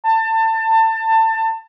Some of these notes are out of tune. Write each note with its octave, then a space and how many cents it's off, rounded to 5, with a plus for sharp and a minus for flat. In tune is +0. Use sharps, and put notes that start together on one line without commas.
A5 +25